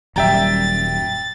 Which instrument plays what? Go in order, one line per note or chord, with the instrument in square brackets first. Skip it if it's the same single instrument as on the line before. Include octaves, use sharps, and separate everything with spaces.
[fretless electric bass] D#1 F#2 G3 [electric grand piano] E5 G5 A#5 [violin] A6